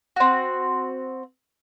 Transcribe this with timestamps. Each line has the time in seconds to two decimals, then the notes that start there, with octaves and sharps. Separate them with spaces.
0.16 C4 F#4